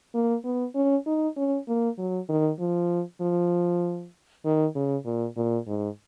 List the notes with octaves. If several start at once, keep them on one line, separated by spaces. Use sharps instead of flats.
A#3
B3
C#4
D#4
C#4
A#3
F#3
D#3
F3
F3
D#3
C#3
A#2
A#2
G#2